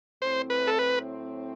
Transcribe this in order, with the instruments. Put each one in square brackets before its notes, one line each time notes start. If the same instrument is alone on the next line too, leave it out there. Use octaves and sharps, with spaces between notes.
[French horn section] A2 F#3 C4 E4 [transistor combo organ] C5
[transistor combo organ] B4
A4
B4